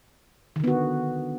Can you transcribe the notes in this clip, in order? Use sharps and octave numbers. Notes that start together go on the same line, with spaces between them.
D3 D#3 B3 F#4